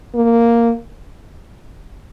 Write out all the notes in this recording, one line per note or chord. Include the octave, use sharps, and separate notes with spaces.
A#3